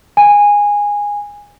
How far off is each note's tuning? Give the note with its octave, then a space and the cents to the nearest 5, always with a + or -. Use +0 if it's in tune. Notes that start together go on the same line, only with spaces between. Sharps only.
G#5 -15